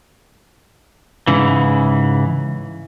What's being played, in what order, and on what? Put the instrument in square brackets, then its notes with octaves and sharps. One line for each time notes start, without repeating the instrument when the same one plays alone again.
[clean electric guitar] G#2 C#3 E3